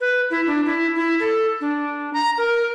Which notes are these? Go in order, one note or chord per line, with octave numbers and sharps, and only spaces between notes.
B4
E4
D4
E4
E4
A4
D4
A#5
A#4